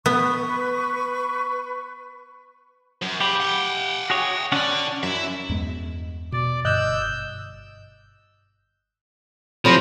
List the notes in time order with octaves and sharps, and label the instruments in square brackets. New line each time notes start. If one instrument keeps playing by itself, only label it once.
[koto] B3 [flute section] B4 C#6
[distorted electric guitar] F#2
[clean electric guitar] G4 [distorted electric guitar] F5 B5
[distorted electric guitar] F#5 G5
[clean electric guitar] F#4 G#4 C#5
[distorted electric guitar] D3 D5 [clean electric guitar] C#4 D4 F#5
[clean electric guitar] F#2 [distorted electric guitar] E4 E5
[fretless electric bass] E2 G2 G#3
[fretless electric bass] B2 [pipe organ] D5
[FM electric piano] G1 D#5 F#6 [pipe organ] E6 G6
[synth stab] A2 C3 F#3 [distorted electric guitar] F3 [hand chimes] C5 B5 A#6